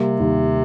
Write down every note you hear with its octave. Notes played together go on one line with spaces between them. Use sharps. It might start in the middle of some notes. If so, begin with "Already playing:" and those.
Already playing: C3 G3 A#3
D#2